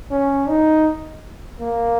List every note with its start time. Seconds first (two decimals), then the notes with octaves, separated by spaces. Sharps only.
0.11 C#4
0.49 D#4
1.60 A#3